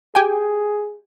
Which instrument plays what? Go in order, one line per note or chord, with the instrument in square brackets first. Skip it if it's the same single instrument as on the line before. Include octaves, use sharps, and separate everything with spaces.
[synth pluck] G4 G5 G#5 [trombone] G#4